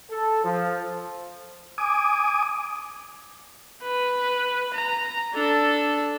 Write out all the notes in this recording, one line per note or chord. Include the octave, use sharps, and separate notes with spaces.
A4
F3
G#5 D6 D#6
B4
A#5
D4 A4